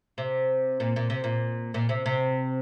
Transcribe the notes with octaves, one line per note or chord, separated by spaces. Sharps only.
C3
A#2
A#2
C3
A#2
A#2
C3
C3